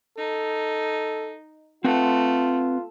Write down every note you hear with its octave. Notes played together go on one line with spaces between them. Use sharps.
D#4 A4
A3 C4 F4 B4 F#5